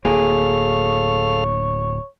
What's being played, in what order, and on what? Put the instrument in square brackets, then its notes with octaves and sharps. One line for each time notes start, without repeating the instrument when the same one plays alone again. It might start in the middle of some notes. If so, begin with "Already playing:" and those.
[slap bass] D1 A#3 [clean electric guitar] G#4 [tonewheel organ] A4 F5 F6 [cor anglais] C#5